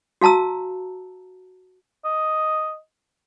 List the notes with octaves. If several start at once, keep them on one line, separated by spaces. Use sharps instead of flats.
F#4 F5 A5 A#5 E6
D#5